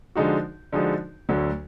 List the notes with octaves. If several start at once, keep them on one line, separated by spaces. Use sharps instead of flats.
D3 F3 G#3 D#4 F#4
D3 F3 G#3 D#4 F#4
D2 D3 F#3